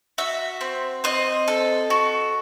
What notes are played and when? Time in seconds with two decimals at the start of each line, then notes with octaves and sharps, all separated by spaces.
0.18 F#4 E5
0.61 C4
1.04 C4 D#5
1.48 A4
1.90 F#4